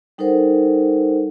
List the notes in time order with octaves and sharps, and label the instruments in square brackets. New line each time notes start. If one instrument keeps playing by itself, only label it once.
[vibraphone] G3 D#4 A4 A#4 C5 F#5